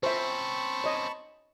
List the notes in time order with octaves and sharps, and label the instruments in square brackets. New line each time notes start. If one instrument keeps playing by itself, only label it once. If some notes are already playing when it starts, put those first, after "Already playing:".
[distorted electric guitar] C4 C#4 [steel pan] C5 E5 [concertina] A5 B5 C#6
[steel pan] C#5 D#5